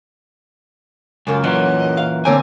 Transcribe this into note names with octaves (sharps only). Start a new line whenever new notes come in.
C#2 F#2 A#3 F4 G#5
A#2 E3 F#3 D#5
F5
D3 A#3 C4 C#5 G#5